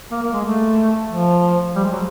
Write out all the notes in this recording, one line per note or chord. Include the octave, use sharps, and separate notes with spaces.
A#3
A#3
G#3
A3
F3
G3
G#3
F#3